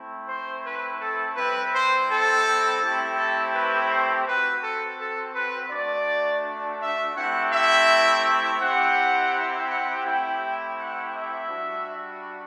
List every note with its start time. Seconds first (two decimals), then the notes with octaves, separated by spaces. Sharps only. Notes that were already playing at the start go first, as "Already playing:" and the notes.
Already playing: A3 C4 E4
0.27 C5
0.63 B4
0.99 A4
1.35 G3 C4 E4 B4
1.71 C5
2.08 A4
2.80 A3 C4 E4 G4
3.17 A4
3.52 B4
3.89 C5
4.25 C4 F#4 B4
4.61 A4
4.97 A4
5.34 B4
5.69 A3 D4 F#4 D5
6.79 E5
7.15 A3 C4 E4 G4 F#5
7.51 E5
8.59 C4 E4 G4 F#5
9.67 F#5
10.04 A3 C4 E4 G4 G5
10.77 F#5
11.13 E5
11.50 G3 D4 F#4